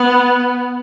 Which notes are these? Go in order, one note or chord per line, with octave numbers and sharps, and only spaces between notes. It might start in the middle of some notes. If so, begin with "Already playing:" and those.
Already playing: B3